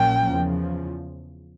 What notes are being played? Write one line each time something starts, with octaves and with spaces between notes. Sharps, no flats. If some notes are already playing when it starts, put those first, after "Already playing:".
Already playing: A#1 A#2 F#3 A#3 C#4 G5
E2 C#3 F3